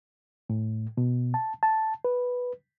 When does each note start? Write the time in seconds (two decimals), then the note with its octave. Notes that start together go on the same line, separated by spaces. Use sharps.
0.50 A2
0.97 B2
1.34 A5
1.63 A5
2.05 B4